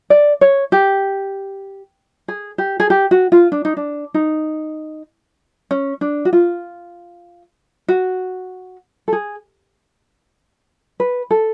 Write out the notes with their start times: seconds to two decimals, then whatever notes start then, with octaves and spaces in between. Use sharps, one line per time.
0.10 D5
0.41 C#5
0.72 G4
2.28 G#4
2.58 G4
2.80 G#4
2.90 G4
3.11 F#4
3.32 F4
3.52 D4
3.65 D#4
3.77 D4
4.14 D#4
5.71 C#4
6.01 D4
6.25 F#4
6.33 F4
7.88 F#4
9.08 A4
9.13 G#4
11.00 B4
11.31 A4